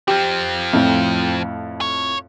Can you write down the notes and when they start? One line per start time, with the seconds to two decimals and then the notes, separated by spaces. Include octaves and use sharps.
0.08 F3 C4 G4
0.73 F2 A2
1.81 C#5